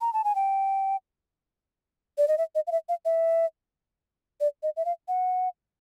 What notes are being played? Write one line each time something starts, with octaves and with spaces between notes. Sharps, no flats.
A#5
A5
G#5
G5
D5
D#5
E5
D#5
F5
E5
F5
E5
D5
D#5
E5
F5
F#5